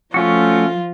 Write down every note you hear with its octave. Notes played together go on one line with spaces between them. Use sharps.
F3 A3 C#4 F4 F#4